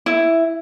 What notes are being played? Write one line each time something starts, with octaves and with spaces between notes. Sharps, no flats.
E4